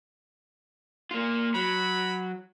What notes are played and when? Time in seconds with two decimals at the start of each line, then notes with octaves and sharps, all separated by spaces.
1.11 A#3 F4
1.54 F#3 B5